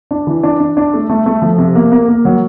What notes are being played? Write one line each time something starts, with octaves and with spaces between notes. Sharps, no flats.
D4
E3
D4
D4
D4
A3
A3
A3
F3
C3
A#3
A#3
A#3
F#3